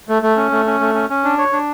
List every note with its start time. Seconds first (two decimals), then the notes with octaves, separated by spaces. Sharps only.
0.09 A3
0.22 A3
0.37 C#4
0.51 A3
0.67 C#4
0.80 A3
0.94 C#4
1.10 C#4
1.24 D4
1.38 C#5
1.53 D4